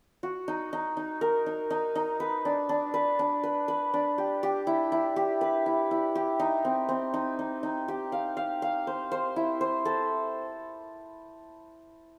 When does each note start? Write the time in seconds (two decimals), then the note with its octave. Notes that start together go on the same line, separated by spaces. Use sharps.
0.23 F#4
0.48 D#4
0.73 D#4
0.97 D#4
1.21 A#4
1.46 D#4
1.70 D#4
1.95 D#4
2.20 B4
2.45 D4
2.69 D4
2.94 B4
3.19 D4
3.43 B4
3.68 B4
3.94 D4
4.18 G4
4.43 G4
4.67 E4
4.92 E4
5.16 G4
5.41 B4
5.66 E4
5.91 E4
6.15 G4
6.39 D#4
6.65 C4
6.89 C4
7.14 D#4
7.39 D#4
7.63 D#4
7.88 G4
8.12 F5
8.37 F5
8.62 F5
8.87 C5
9.12 C5
9.36 E4
9.61 C5
9.85 A4